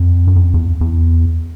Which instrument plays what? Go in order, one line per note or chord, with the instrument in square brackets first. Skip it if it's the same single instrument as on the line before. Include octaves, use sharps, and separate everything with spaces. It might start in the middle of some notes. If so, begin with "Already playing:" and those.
Already playing: [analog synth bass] F2
F#2
F2
E2
E2